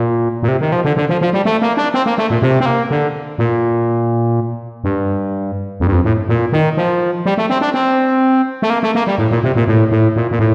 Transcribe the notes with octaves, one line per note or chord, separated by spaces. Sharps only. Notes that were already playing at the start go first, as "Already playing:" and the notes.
Already playing: A#2
A#2
C3
D#3
F3
D3
D3
F3
F3
G3
A3
A#3
D4
C4
A#3
A3
A#2
C3
C4
A#3
D3
A#2
G2
F2
G2
F2
A2
A#2
D#3
F3
G3
A3
C4
D4
C4
A3
A#3
A3
A#3
G3
A2
A#2
C3
A#2
A2
A2
A#2
A#2
A2